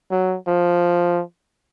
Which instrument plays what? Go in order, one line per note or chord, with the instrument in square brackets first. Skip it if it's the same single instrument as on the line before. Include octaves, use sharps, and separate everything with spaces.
[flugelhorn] F#3
F3